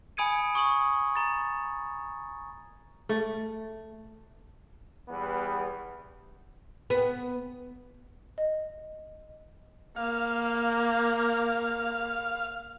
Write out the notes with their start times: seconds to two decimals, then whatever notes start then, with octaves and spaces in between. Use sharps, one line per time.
0.17 G#5 B5 D#6 G#6 C#7 D#7
0.55 C#6 D#6 F#7
1.15 A#5 A6
3.09 A3
5.09 E2 G3 B3
6.90 B3
8.38 D#5
9.96 A#3 F5